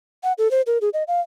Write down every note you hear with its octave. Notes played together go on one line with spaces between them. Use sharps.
F#5
A4
C5
A#4
G#4
D#5
F5